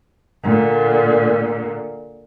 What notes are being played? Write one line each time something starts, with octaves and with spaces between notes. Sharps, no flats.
A#2 D3